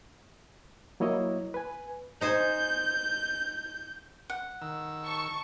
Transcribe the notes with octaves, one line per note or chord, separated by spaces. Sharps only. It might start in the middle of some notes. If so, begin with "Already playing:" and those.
F#3 A#3 E4 C#5 D#5
B4 G#5
D#4 C5 G#5 G6
F#5
D#3 E6
A5 C#6